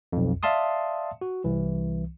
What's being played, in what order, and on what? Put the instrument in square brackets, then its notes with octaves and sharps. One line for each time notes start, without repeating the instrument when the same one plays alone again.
[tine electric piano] B1 F2
D5 E5 F5 A5 C6 D#6
F#4
C2 E3